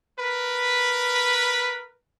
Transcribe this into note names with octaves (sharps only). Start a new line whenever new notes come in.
A#4 B4